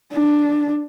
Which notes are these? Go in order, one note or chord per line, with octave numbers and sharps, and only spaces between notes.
D4